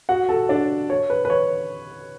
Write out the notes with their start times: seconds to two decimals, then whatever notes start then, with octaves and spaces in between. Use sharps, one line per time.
0.09 F#4 F#5
0.29 A4 A5
0.49 D4 D5
0.90 C#5
1.10 B4
1.25 B4
1.30 C#5